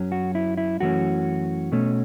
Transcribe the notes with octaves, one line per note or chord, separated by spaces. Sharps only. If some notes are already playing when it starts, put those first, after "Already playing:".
Already playing: F#2 F#3 C#4
F#4
E4
E4
F#2 E3 A3 C#4 F#4
B2 A3 C#4